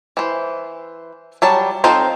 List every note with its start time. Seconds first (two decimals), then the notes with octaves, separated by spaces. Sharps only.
0.17 E3 C5
1.42 F#3 G3 A5
1.84 C4 D#4 F4 A4 C5